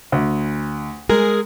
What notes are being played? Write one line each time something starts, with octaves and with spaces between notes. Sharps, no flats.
D2
G#3 G#4 A#4